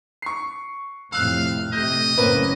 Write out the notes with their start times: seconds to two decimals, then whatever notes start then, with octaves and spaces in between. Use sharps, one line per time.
0.22 C#6 C7
1.12 F2 A2 C3 F5 E6 F#6
1.73 C3 A3 D#5 G6
2.18 F#1 A2 A#3 C4 C#4 B4